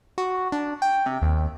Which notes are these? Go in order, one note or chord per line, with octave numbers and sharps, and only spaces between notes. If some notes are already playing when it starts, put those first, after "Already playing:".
F#4
D4
G5
C3
D#2